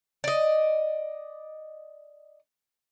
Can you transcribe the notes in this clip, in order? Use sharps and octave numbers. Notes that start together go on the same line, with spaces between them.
D5 D#5